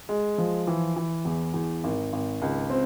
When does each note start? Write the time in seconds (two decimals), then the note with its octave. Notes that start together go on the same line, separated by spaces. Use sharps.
0.09 G#3
0.38 F3
0.67 E3
0.96 E3
1.25 E2
1.54 E2
1.84 G#1
2.13 G#1
2.42 C#2
2.70 C4